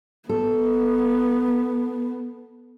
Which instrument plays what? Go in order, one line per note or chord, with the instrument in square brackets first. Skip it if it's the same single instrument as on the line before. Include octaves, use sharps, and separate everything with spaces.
[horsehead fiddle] B3 [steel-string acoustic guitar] A4